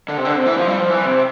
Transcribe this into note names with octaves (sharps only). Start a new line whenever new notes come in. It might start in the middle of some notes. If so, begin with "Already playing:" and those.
D3
C3
D3
C3
E3
F3
G3
F3
E3
C3